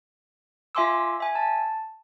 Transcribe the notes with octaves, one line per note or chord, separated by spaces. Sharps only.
F4 E5 G#5 C6 D6 E6
E5 G#5
A5